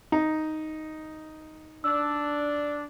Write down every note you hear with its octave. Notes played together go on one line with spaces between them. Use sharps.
D#4
D4 E6